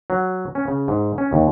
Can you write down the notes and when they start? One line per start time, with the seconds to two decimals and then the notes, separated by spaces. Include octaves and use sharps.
0.10 F#3
0.55 C#4
0.68 C#3
0.88 G#2
1.18 C#4
1.33 D#2